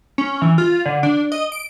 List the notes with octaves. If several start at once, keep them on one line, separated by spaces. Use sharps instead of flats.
C#4
E3
F4
D3
D4
D#5
D7